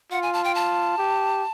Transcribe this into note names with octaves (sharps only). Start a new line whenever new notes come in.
F4 F#5
G#5
A5
G5
A5
G4